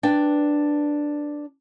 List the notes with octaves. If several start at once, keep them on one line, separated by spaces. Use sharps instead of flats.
D4 B4 D5 G5